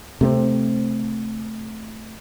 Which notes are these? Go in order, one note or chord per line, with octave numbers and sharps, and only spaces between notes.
C3 A3 A#3 C4